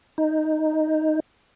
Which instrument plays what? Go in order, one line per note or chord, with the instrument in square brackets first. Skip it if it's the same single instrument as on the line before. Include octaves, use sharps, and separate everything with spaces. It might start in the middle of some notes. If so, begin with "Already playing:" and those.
[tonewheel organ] D#4